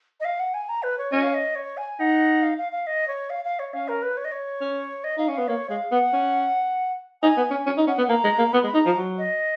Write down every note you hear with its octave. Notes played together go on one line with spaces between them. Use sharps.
D#5
F5
F#5
G#5
A#5
B4
C#5
C#4 D#5
F5
D#5
C#5
G#5
D#4 F#5
F5
F5
F5
D#5
C#5
F5
F5
C#5
C#4 F5
A#4
B4
C#5
D#5
C#5
C#4
D#5
D#4 F5
C#4
B3 F5
A#3 C#5
G#3 F5
B3 F#5
C#4
D#4 G#5
B3
C#4
C#4
D#4
C#4 F#5
B3
A#3 A#5
G#3
A#3
B3 B5
G#3 B5
D#4 A#5
F3
F#3
D#5